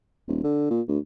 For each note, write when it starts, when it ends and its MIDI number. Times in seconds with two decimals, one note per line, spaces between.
0.28 0.44 27
0.44 0.66 50
0.70 0.81 46
0.88 0.98 38